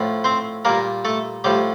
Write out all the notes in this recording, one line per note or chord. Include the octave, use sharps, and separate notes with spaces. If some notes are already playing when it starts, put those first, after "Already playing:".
Already playing: A2 F3
C4 C5
A#2 G3 A#3 A#4
A3 A4
A2 F3 G3 G4